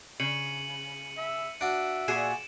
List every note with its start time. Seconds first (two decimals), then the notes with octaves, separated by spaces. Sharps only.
0.20 C#3 C#7 D#7 F#7
1.18 E5
1.61 D4 F#4 E5 D7
2.08 A#2 F#4 G#4 G#5 E7